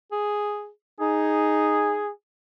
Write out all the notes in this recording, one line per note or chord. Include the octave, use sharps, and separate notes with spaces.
G#4
D#4 G#4